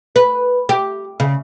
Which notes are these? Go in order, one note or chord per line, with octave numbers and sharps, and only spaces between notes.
B4
G4
C#3